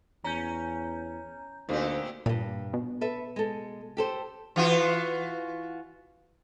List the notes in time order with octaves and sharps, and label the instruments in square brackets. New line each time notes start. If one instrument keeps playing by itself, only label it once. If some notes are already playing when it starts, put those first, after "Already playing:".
[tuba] E2 [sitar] C#4 [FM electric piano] A#5 G6
[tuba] D2 [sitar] A#2 G4 [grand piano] A#3 C4 D#4
[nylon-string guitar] E2 G2 [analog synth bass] A#2
[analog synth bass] B2
[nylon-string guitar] A4 B4 E5
G#3 A4
G4 A4 C5
[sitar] E3 F4 F#4